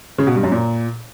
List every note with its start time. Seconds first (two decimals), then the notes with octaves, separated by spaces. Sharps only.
0.18 C#3
0.27 B2
0.35 G2
0.43 F#2
0.52 A#2